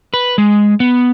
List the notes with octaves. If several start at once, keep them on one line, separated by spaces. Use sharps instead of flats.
B4
G#3
B3